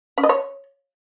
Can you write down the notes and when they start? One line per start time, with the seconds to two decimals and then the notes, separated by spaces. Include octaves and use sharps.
0.18 C#4
0.23 D#5
0.29 C#5